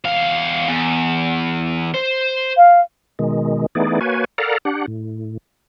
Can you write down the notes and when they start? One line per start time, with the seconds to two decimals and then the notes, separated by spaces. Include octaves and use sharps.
0.05 E2 F5
0.68 E2
1.94 C5
2.57 F5
3.19 B2 D#3 G#3
3.75 E3 A3 B3 D#4 G#4 D5
4.01 A#3 F#4 B4 C#5 G#5
4.38 A4 A#4 D5 F5 F#5 A#5
4.65 D4 G4 F#5
4.87 A2